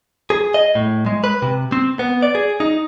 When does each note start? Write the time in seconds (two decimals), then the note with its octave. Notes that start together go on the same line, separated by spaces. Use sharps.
0.30 G#4
0.54 D#5
0.75 A2
1.06 G#3
1.24 B4
1.42 C3
1.72 C4
1.99 B3
2.22 D5
2.35 G#4
2.60 D#4